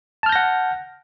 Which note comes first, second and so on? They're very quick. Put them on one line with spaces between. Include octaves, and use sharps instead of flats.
A5 F6 G6 A#6 F#5